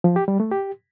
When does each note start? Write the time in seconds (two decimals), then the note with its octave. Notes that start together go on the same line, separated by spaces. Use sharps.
0.04 F3
0.16 G4
0.28 G3
0.40 A3
0.51 G4